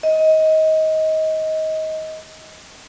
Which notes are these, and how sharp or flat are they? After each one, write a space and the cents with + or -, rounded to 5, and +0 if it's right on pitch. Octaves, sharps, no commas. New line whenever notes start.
D#5 +20